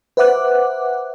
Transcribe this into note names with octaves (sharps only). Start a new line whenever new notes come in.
B4 C5 E5 F#5 D6 F#6